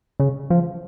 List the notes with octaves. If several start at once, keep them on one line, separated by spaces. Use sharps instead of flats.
C#3
F3